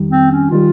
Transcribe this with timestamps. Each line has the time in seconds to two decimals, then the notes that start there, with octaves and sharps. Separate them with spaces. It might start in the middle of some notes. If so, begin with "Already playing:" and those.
Already playing: F2 D#3 G3
0.12 C4
0.32 C#4
0.50 D#3 G3 F4